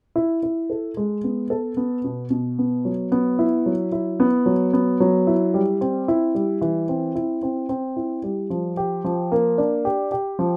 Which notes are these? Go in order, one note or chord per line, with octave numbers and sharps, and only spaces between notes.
E4
E4
A4
G#3
B3
A4
B3
B2
B2
B3
F#3
B3
E4
F#3
E4
B3
F#3
B3
F#3
E4
G3
C4
E4
G3
E3
C4
E4
C4
C4
E4
G3
F3
G4
F3
A#3
D4
G4
G4
F3